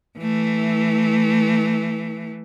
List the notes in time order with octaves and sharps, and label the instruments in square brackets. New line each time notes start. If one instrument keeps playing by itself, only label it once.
[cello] E3 A3